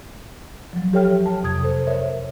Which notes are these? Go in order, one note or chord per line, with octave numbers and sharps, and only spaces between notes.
F3 F#3
G4 A4 C#5 E5 G5 F6
A5
F2 C3 D#6 G#6
A4 C5
A#4 C#5 E5